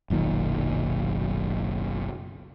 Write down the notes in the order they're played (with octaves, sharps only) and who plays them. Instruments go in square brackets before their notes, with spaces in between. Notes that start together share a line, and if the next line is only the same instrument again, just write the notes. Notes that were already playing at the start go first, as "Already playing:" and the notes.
[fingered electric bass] F#1 B1 A#2 D#3